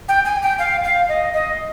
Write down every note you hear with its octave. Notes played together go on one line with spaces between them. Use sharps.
G5
G#5
G5
F5
F5
D#5
D#5